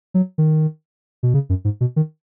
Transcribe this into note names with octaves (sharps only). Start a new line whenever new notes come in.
F#3
D#3
B2
C#3
F#2
G#2
B2
D#3